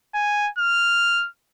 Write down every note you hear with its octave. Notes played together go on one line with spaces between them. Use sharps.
G#5
F6